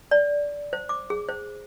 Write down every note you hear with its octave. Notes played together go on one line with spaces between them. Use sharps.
D5
C5
D6
G#4
C5